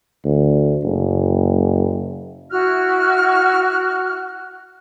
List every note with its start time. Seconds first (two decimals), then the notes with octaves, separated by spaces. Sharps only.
0.25 D2
0.83 F#1
2.51 E4 F#4 F6 F#6